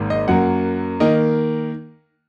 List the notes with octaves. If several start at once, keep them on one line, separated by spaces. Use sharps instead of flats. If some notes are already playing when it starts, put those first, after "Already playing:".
Already playing: G#1 G#2 A#3
D#5
F#2 F#3 A#3 F#5
D#3 A#3 D#5